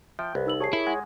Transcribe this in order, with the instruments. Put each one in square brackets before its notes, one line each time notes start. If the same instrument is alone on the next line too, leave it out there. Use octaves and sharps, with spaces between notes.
[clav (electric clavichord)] F3 [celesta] E5 [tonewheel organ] G5
[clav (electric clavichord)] C2 [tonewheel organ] B4
[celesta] D#4 E6 F#7
[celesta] G4 A5 C7 [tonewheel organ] G#4 C#5
[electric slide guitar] E4 [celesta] A#4 E5
[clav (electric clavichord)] G#3 [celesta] F#5 G#5